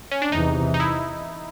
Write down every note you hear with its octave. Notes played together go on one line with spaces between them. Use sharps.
C#4
D4
E2 C3 E3 D#4
D#4
E4